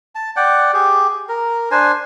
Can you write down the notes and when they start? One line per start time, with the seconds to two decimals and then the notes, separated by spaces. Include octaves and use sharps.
0.15 A5
0.36 D5 F#5 G5
0.74 G4 G#4
1.29 A#4
1.71 D4 C5 G#5